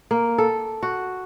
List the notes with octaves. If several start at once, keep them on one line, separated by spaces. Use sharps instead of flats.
A#3
A4
F#4